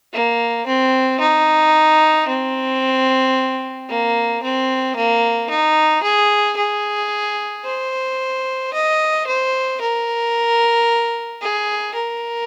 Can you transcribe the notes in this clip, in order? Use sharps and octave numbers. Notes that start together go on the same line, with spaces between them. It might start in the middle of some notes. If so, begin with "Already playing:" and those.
A#3
C4
D#4
C4
A#3
C4
A#3
D#4
G#4
G#4
C5
D#5
C5
A#4
G#4
A#4